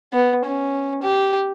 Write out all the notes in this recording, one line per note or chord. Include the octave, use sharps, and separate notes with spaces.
B3
C#4
G4